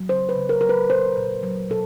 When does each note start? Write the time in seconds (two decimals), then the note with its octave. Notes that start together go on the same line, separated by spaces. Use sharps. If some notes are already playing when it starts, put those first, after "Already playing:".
Already playing: F#3
0.09 C#3 C5
0.29 B4
0.36 C#3
0.49 A#4
0.61 F#3 A#4
0.69 B4
0.89 A#2 C5
1.17 A#2
1.43 F#3
1.70 B2 A4